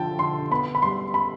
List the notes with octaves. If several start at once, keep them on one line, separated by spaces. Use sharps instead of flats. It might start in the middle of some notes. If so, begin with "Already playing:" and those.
Already playing: D3 F3 G5 A5
D3 C6
B3 B5
B5
G3 C6
B5